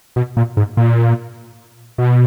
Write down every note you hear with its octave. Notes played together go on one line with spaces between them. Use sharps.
B2
A#2
G#2
A#2
B2